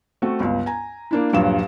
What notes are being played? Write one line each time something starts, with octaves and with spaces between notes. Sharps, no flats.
A3 C4 F#4
G1 C#2
G#5 A#5
A#3 D4 E4
D#1 G2 A#2 F3 F#3 E7